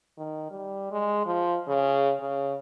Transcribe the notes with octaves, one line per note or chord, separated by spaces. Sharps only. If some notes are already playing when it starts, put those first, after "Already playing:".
D#3
G3
G#3
F3
C#3
C#3